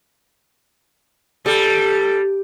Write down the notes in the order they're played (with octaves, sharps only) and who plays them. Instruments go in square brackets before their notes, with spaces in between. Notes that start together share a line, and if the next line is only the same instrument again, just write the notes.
[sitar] G3 [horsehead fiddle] A4